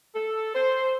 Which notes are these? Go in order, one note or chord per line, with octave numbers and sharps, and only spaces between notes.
A4
C5